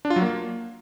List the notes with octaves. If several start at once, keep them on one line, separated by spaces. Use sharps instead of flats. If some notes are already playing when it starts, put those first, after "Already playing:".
D4
F4
F#3
A#3